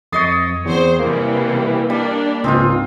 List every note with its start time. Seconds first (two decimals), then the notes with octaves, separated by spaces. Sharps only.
0.12 F2 C#5 D#5 D#6 A6 C7
0.65 E2 C4 C5
0.99 C3 E3 G3 A#3
1.90 G3 A#3 D4
2.44 C#2 G#2 C4 D#4 F4